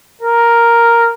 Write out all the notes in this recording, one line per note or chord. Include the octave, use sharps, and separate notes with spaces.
A#4